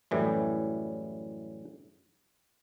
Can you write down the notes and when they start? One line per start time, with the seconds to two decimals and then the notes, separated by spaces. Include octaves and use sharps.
0.11 F#2 A2 E3 G3